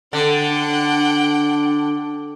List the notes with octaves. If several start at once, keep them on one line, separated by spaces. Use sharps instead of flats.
D3 D4 F#5 G5